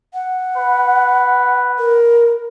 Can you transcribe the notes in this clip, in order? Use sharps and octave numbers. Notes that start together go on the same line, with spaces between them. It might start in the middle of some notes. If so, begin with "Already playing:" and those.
F#5
B4
A#4